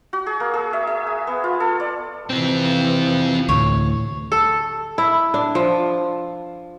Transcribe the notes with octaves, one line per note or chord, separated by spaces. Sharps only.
F#4
G#4
A#3
G#4
E5
E5
G#5
B3
F4
A4
D5
C3 E3 C4 F4
D2 A2 C#5
A4
E4
D4
F3